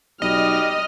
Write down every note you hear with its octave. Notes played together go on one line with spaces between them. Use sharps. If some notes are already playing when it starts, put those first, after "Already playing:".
B1 G3 D#5 F6